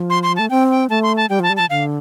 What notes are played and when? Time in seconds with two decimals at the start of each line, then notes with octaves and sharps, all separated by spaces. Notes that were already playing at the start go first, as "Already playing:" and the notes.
Already playing: F3
0.10 C6
0.23 C6
0.36 A3 A5
0.50 C4 G5
0.70 G5
0.90 A3 A5
1.03 C6
1.17 A5
1.29 G3 G5
1.40 F3 A5
1.50 G3
1.57 F3 A5
1.70 D3 F5